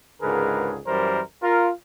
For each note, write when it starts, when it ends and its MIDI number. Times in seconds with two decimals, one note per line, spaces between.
0.22 0.78 37
0.22 0.78 44
0.22 0.78 50
0.22 0.78 68
0.22 0.78 70
0.22 0.78 71
0.87 1.21 42
0.87 1.21 52
0.87 1.21 55
0.87 1.21 70
0.87 1.21 72
1.42 1.69 65
1.42 1.69 70